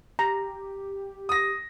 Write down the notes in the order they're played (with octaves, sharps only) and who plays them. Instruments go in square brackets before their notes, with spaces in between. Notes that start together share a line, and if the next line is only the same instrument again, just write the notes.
[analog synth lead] G4 [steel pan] A#5
[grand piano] D#6 A#6